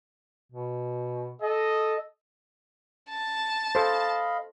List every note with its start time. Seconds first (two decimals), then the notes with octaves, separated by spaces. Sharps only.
0.52 B2
1.41 A4 D#5
3.10 A5
3.75 A4 C5 D#5 F5 B5